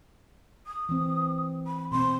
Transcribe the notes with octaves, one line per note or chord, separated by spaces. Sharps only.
D#6
E3 C4
B5
B2 C4 C6